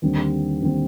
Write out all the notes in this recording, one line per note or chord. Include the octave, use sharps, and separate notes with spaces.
D#2 D3 G3 C4
D#2 D3 G3 C4